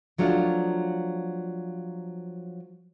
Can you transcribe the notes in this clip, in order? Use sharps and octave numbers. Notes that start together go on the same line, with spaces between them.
F3 F#3 A3 D4 F4